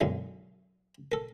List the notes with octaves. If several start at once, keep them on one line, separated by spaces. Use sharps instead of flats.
B1 F#2 D3 G#3
A4 A#4